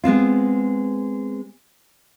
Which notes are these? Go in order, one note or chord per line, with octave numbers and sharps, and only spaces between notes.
G#3 B3 C4 F4